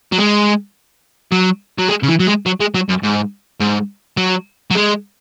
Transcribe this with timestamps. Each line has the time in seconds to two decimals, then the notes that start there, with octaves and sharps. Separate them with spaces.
0.12 F#3
0.18 G#3
1.32 F#3
1.79 F#3
1.89 G#3
2.03 C#3
2.09 E3
2.20 F#3
2.27 G#3
2.46 F#3
2.61 G#3
2.75 F#3
2.89 F#2
3.03 G#2
3.60 G#2
4.17 F#3
4.71 F#3
4.75 G#3